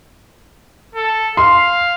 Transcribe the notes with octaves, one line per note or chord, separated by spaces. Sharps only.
A4
F5 C6